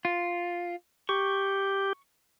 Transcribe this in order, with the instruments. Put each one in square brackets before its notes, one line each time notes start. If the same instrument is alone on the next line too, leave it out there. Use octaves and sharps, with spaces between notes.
[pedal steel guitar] F4
[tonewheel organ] G4 [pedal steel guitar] C#6